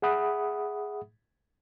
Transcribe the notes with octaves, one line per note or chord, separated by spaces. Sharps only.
G#4 E5 F#5 B5 D#6